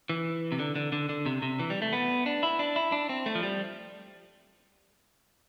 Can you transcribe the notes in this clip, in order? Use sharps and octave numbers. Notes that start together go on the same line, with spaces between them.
E3
C3
D3
D3
D3
D3
C3
C3
E3
G3
A3
B3
D4
E4
D4
E4
D4
C4
A3
F3
G3